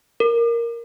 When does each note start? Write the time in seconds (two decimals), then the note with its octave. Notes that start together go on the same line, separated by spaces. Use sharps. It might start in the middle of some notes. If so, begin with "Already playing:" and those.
0.20 A#4